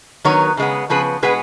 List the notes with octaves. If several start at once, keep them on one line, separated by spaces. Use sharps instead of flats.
D#3 F#3 B3 A#4 C#5
C#3 G#3 B3
C#3 F3 B3 G#4 B4
B2 G#3 B3 G#4 B4